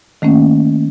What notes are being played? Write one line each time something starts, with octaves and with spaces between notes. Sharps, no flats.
D#3 A3 A#3 C#4